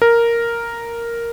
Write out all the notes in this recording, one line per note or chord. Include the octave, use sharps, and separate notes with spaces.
A#4